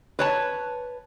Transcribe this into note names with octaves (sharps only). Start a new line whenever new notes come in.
B4 C#5 A5